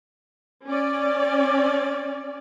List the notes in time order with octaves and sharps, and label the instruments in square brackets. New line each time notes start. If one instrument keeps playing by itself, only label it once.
[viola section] C#4 D5